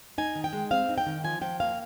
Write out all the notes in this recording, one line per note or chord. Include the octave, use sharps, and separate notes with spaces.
D#4 G#5
D#3
G5
G#3
C4 F5
D#4
G5
D#3
F3 G#5
F3 G5
A#3 F5